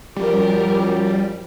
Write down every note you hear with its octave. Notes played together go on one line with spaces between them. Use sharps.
F#2 F3 G3 G4 A#4